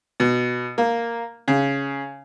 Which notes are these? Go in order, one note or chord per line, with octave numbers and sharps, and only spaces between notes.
B2
A#3
C#3